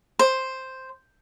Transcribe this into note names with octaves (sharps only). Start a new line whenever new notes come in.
C5